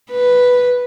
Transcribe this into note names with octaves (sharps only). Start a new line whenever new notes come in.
B4